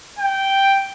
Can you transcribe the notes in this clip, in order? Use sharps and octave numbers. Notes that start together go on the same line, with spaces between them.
G5